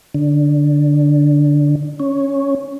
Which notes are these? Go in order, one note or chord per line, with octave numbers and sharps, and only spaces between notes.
D3
C#4